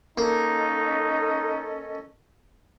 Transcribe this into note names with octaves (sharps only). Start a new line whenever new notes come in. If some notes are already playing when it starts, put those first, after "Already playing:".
A#3 C#4 D#4 A4 D#5